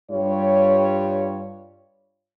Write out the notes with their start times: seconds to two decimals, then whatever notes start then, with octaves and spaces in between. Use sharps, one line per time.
0.11 G2 G3 F4 C#5